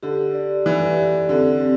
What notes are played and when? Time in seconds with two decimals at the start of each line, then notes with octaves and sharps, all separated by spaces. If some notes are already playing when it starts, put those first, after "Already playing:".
0.03 D3 G4
0.34 D5
0.66 E3 D5
0.97 G4
1.29 D3 C4
1.61 C4